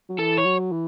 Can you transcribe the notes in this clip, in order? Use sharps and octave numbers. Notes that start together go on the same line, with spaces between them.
F#3
E3 A4
C#5
F#3
E3